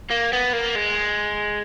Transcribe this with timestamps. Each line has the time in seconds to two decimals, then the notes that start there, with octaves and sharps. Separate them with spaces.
0.10 A#3
0.33 B3
0.53 A#3
0.76 G#3